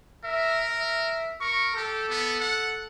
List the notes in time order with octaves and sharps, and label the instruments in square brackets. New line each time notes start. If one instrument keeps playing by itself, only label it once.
[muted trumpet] A#4 [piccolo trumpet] E5
[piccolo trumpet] E5
[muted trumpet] A#4 [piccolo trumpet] C#6
[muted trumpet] G4 [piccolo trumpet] A4
[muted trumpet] B3
F#5